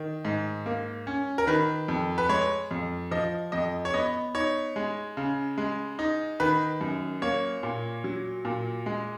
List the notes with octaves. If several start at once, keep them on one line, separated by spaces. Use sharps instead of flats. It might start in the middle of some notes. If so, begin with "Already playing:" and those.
Already playing: D#3
G#2
A#3
C#4
A#4
D#3 B4
F2
B4
G#3 C#5
F2
F3 D#5
F2 D#5
C#5
B3 D#5
D#4 C#5
G#3
C#3
G#3
D#4
D#3 B4
F#2
A#3 C#5
A#2
F#3
A#2
G#3